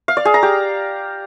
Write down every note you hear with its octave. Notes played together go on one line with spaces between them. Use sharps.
F5
D5
G#4
A#5
G4